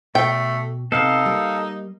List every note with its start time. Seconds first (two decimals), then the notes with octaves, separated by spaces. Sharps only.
0.15 B2 A3 G5
0.92 C3 B3 D#4 A4 F5
1.26 G3 A#3